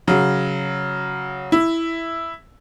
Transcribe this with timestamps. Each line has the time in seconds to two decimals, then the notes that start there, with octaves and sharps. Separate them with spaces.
0.07 C#3 F#3
1.52 E4